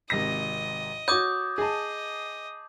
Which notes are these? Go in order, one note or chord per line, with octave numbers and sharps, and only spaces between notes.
G#1 C3 D#5 A#6
F#4 C#5 D6 D#6 G6
G#4 D#5 A5